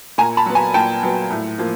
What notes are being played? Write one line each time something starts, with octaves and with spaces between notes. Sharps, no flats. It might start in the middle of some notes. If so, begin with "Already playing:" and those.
A#2 G#5 A#5
A5 B5
F#3 B3
G#5 A#5
A#2 G5 A5
F#3 B3
A2
F3 A#3